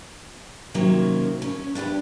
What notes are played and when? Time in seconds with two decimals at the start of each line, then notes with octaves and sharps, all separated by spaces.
0.74 C3 D#3 F#3 A#3 C#4
1.42 C#4
1.75 D4 E4 G4 B4